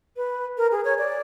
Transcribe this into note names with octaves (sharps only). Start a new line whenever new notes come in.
B4
A#4
G#4
C#5
D5